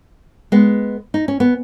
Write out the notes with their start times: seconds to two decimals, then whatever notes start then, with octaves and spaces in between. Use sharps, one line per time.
0.52 G#3 B3
1.14 D#4
1.28 C#4
1.40 B3